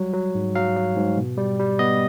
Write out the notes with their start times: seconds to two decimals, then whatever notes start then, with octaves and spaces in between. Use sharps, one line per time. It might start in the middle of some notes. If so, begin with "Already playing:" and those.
Already playing: F#3 G3
0.13 F#3
0.35 G#2
0.55 F#3 F5
0.77 F#3
0.97 G#2
1.18 B2
1.38 G3
1.59 G3
1.79 B3 D#5